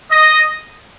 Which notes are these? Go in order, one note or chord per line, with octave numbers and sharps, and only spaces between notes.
D#5